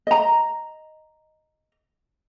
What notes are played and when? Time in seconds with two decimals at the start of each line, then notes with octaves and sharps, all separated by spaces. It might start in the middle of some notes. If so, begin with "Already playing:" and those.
0.07 D#5 A#5